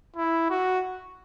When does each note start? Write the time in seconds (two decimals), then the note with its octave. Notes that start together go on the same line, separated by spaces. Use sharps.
0.16 E4
0.50 F#4